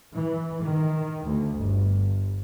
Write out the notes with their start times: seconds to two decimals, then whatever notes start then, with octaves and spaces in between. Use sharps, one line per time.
0.16 E3
0.62 D#3
1.25 D2
1.59 G1